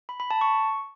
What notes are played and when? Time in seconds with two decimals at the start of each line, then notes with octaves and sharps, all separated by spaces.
0.09 B5
0.20 B5
0.31 A5
0.41 C#6